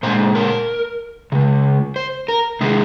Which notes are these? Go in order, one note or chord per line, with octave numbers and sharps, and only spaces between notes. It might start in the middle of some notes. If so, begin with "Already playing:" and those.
A#2 G#3 C5
A#4
C#3 G#3
C5
A#4
C3 D#3 G#3 G#4